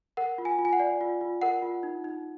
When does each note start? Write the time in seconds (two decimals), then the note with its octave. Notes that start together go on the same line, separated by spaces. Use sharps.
0.17 A#4 F#5
0.38 F4
0.45 G#5
0.59 F4
0.65 G#5
0.73 F#5
0.80 D5
1.01 F4
1.21 F4
1.42 A#4 F#5
1.62 F4
1.83 D#4
2.04 D#4